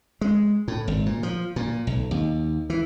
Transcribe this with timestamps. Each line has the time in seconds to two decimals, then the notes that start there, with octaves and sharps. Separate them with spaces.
0.21 G#3
0.68 A2
0.88 G#1
1.06 A#2
1.23 F3
1.56 A#2
1.87 B1
2.11 D#2
2.70 E3